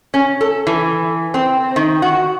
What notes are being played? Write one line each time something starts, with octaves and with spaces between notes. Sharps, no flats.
C#4
A4
E3
C4
D#3
F#4